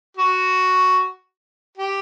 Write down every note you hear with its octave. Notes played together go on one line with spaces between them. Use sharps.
F#4
G4